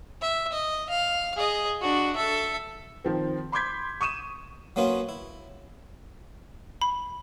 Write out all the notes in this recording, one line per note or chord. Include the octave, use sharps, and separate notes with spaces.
E5
D#5
F5
G#4 D#5
D4 F#4
A4 E5
D#3 F3 C4
B5 C6 D6 G6 G#6 B6
C#6 D#6 D#7 E7
F#3 A#3 B3 C#4 F4 F#4
E4
B5